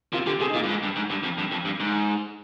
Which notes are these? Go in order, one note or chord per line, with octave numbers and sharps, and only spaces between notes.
C3 F4
D3 G4
C3 G#4
D#4
A#2 F4
G2
G#2
G2
G#2
G2
F2
G2
F2
G2
G#2